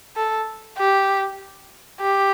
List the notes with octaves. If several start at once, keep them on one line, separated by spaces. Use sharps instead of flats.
A4
G4
G4